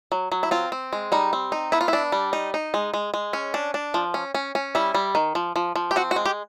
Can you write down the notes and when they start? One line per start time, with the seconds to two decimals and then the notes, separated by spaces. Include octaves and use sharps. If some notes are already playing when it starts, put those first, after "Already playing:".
0.12 F#3
0.32 F#3
0.43 E4
0.51 C4 F4
0.72 C4
0.93 G#3
1.12 G3 D#4
1.33 C4
1.52 D#4
1.72 B3 E4
1.81 F4
1.88 E4
1.93 D4
2.12 G3
2.33 D#4
2.54 D#4
2.74 G#3
2.94 G#3
3.14 G#3
3.33 C#4
3.54 D4
3.74 D4
3.94 F3
4.14 C#4
4.35 C#4
4.55 C#4
4.75 G3 E4
4.95 G3
5.15 D#3
5.35 F3
5.56 F3
5.76 F3
5.91 G4
5.96 C4 F#4
6.11 F#4
6.16 G#3
6.26 G4